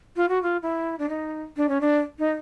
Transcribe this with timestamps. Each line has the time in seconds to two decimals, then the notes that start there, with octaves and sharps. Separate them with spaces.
0.16 F4
0.29 F#4
0.43 F4
0.63 E4
0.99 D4
1.09 D#4
1.57 D4
1.69 C#4
1.81 D4
2.19 D#4